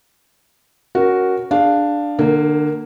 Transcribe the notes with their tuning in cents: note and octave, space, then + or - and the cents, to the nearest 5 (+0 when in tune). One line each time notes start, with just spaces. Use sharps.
C#4 +0 F#4 +0 A#4 +0
D4 +5 G#4 -20 F5 +0
D3 +30 A#3 +0